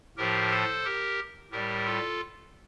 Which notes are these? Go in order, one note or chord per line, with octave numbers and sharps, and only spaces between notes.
A2 F3 G4 A#4
A4 C5
G4 A#4
A2 G3 G4 A#4
F4 A4